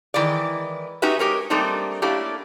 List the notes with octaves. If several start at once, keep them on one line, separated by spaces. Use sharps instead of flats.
D#3 E3 G#3 D5
C#4 D#4 F#4 G4 B4 E5
G#3 G4 A#4 C#5
G3 A3 A#3 C4 D4 D#4
A3 A#3 C#4 D4 E4 G4